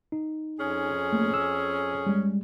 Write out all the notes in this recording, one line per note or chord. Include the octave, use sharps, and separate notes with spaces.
D#4
F2 C#4 G#4
A3 A#3
E6
G3 G#3